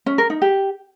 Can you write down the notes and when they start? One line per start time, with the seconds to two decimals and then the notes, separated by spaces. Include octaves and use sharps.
0.06 C#4
0.18 A#4
0.30 D#4
0.42 G4